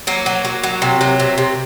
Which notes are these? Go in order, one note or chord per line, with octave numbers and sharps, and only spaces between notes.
F#3 A#3
F#3
F#3
F#3
C3
F#3
C3
C3